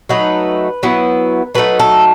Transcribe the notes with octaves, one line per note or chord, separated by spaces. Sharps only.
F#3 A3 D#4 B4
F#3 B3 E4
F#3 A3 D#4 B4
A4